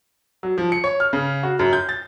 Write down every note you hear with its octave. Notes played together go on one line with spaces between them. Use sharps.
F#3
F3
C#7
C#5
F6
C#3
F#4
F#2
G6
A6